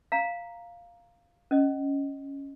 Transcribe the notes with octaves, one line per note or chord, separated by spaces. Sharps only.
F5 A#5
C#4 D#5